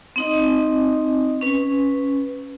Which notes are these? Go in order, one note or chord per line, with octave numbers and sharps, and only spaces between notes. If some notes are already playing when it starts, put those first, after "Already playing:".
C4 D#4 D#5
C#4 B4